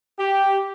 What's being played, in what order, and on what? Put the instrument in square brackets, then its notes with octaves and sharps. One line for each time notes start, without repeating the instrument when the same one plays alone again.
[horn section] G4